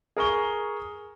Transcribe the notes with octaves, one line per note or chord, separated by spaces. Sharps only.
G#4 A#4 C#6 G7